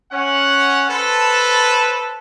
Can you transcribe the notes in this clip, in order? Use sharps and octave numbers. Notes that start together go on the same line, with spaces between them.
C#4 F#5
A4 B4 C5 A5